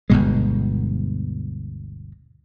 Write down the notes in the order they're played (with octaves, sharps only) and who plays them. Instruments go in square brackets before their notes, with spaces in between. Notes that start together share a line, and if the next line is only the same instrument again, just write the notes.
[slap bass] G1 D2 B2 G#3